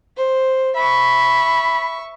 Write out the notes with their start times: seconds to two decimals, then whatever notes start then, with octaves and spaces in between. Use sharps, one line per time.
0.17 C5
0.76 E5 B5 C#6